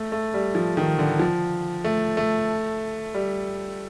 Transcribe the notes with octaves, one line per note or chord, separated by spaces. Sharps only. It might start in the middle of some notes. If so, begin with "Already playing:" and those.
Already playing: A3
A3
G3
F3
D#3
D3
F3
A3
A3
G3